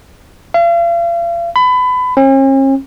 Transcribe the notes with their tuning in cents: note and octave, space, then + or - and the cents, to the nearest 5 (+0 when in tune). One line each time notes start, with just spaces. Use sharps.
F5 -40
B5 +25
C#4 -45